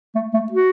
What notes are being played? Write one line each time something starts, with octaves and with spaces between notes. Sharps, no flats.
A3
A3
F#4